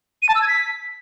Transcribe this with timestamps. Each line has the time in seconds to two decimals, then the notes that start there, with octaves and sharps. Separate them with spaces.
0.22 D#7
0.29 A5
0.35 E6
0.42 G#6
0.48 B6